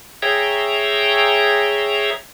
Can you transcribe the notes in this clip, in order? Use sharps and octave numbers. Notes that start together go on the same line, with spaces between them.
G#4 C#5 E5 G5 A#5